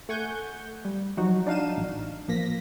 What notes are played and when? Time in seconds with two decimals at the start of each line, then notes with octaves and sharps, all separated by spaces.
0.09 A3 F#5 G#5 C#6 G6
0.85 G3
1.17 F3 F#3 D#4 F#4
1.47 D4 D#4 F5 D#7 E7
1.78 A1
2.28 A1 F3 A#3 A#6 B6